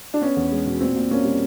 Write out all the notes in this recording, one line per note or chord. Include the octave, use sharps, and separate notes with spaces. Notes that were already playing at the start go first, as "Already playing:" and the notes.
D4
B3 C#4
E2
G#3
B2
A#2 C4
A#2
A#3 C#4
G3